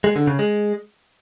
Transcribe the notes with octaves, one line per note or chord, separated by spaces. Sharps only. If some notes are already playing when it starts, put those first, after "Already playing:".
G#3
D3
C#3
G#3